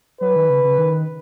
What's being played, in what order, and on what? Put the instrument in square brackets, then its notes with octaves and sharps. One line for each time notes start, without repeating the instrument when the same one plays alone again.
[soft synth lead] F#3 [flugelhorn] B4
[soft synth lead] D#3
C#3
C#3
D#3